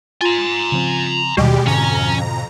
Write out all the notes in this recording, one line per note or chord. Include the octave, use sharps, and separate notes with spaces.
F4 G#5 A#5
C#3 F3 C4
D#2 B2 D#3 G3 G#3 G4
F2 G#2 D3 C#4 A#5